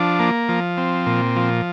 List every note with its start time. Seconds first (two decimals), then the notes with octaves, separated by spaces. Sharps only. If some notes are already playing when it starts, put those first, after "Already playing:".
Already playing: F3 D4
0.19 A#3
0.49 F3
0.77 C4
1.06 A#2
1.36 F3